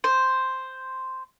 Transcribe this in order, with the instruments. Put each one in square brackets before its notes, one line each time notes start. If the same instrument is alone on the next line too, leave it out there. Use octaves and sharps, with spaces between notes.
[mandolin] C5